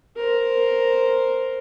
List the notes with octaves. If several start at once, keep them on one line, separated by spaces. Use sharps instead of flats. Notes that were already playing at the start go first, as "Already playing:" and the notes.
A#4 C5